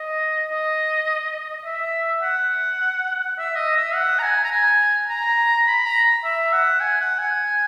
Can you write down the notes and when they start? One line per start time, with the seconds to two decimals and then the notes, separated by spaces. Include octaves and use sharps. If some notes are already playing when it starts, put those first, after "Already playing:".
Already playing: D#5
0.51 D#5
1.65 E5
2.22 F#5
3.38 E5
3.56 D#5
3.76 E5
3.95 F#5
4.19 A#5
4.23 G#5
4.44 A#5
4.51 G#5
5.09 A#5
5.67 B5
5.85 A#5
6.24 E5
6.53 F#5
6.80 G#5
7.01 F#5
7.19 G#5